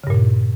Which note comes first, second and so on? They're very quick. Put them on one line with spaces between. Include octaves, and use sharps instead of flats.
C#3 G2 A#2